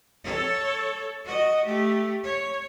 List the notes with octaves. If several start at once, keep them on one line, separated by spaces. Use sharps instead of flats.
A4 C#5
F#4 D#5
A3 G4
C#5